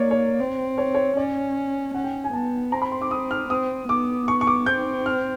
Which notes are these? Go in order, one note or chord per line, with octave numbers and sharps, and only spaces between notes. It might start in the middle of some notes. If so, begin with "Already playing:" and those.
Already playing: A#3 C#5 D5
C#5
C4
C#5
C#5
C#4 D5
C#4 F#5
G5
G#5
B3 A5
C4 A#5
B5
C6
D6
D#6
F6
C4 D#6
B3 D6
C#6
C#6
D6
C4 G6
F6